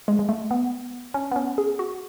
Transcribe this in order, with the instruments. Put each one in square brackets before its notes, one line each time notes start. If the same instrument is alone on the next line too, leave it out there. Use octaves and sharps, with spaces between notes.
[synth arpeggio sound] G#3
G#3
A3
B3
C#4
B3
C#4
G#4
F#4